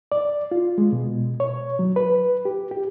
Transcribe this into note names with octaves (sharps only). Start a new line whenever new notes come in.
D5
F4
G#3
B2
C#5
F#3
B4
G4
G4